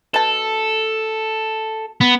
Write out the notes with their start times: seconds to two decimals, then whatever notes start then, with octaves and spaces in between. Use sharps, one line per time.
0.14 B2 A4 A5
2.01 B3